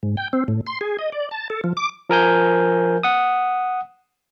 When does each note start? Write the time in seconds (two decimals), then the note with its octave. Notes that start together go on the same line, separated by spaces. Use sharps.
0.03 G#2
0.17 G5
0.33 C4
0.48 A2
0.67 C6
0.81 G#4
0.99 D#5
1.12 D5
1.31 A5
1.50 A4
1.64 F3
1.77 D6
2.10 F3 A#4 G#5 G6
3.03 F#5 D#6